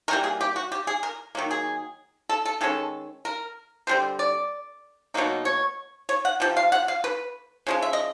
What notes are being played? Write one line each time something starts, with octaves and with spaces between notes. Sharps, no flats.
E3 G3 A#3 A#4
G#4
G4
F#4
G4
G#4
A#4
D#3 F#3 A#3
G#4
A4
A4
D#3 G#3 C#4 A4
A#4
D3 G3 C4 C5
D5
B2 F#3 A#3 D#4
C#5
C#5
F#5
C3 F3
F5
F#5
F5
B4
C#3 F3 G#3
E5
D#5